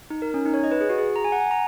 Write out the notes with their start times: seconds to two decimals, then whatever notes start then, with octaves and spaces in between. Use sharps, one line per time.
0.10 D#4
0.22 A#4
0.34 C#4
0.45 D#4
0.54 C#5
0.64 D#5
0.71 B4
0.81 G#4
0.89 F#4
0.98 G#4
1.16 A#5
1.24 G#5
1.32 F#5
1.40 G#5
1.51 A#5